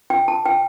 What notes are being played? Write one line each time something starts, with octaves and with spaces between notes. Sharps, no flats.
G5
A5
G5